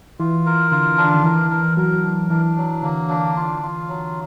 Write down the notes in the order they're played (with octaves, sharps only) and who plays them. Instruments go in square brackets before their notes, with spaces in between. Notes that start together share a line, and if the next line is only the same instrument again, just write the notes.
[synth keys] E3 [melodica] F4
[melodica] A#4
[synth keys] D3 [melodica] F4
[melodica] D4
[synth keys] D3
D#3
[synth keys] E3 [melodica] A#4
[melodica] A#4
[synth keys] F#3 [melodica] A#4
[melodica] D4
[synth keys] E3 [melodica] D4
[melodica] F#3
[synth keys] D3 [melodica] A#3
[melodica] D4
F4
F4
F#3